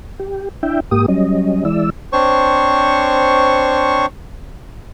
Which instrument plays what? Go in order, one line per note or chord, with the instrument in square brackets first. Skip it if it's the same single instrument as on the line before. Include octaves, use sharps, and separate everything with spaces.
[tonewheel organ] G4
D4 E4 E5 G5
G#2 A#3 G4 D#6
F#3 G3 C#4 D#5
E3 G#3 E4 D5 E6
[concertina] C4 D4 C5 C#5 C#6